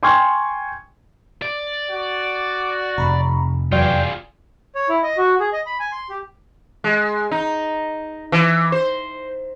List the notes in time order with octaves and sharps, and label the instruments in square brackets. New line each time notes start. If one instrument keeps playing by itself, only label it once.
[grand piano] G5 G#5 C6 C#6 F6 G#6
[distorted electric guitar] D5
[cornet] F#4
[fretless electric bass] F1 [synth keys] A#5 B5 C#6
[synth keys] E2 F#3 D5 [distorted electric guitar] F4 G#4 [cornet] G5
[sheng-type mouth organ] C#5
E4
D#5
F#4
G#4
D#5
B5
G#5
C6
G4
[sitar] G#3
D#4
E3
C5